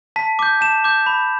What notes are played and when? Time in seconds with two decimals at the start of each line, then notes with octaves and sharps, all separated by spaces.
0.16 A5 B6
0.39 D6 G6
0.61 A5 E7
0.84 D6 G6
1.06 B5